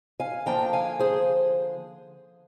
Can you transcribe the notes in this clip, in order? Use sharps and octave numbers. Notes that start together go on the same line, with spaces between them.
F5 G#5
D3 F3 A#3 D4 G5 A#5
F5 G#5
G#4 C5